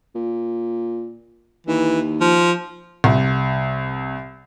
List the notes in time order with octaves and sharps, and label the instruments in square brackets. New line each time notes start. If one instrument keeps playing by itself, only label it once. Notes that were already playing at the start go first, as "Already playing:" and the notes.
[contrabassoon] A#2
[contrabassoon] D#2 [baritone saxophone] E3
[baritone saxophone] F3
[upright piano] C2